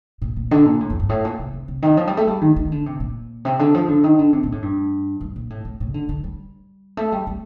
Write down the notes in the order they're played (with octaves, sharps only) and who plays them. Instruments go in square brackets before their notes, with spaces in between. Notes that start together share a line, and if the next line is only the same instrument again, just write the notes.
[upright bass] A#2
A#2
D3
A#2
A2
F2
G2
A2
A#2
C3
C3
C3
D#3
F3
G3
A3
G3
D#3
D#3
D3
C3
A#2
C3
D3
F3
D3
D#3
D3
C3
A#2
A2
G2
G2
A#2
A2
A2
A2
D#3
D3
D3
G3
A3
G3
G3